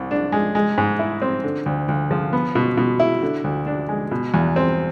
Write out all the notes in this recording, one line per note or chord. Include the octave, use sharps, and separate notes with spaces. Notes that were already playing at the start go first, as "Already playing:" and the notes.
Already playing: C2 C3
D4
G#3
G#3
G#2
E4
C4
D3
D2
D2
F3
B3
B2
B2
E4
D3
D2
D4
G#3
B2
E2
C4